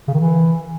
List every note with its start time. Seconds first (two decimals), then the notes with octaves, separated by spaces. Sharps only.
0.08 C#3
0.14 D#3
0.20 E3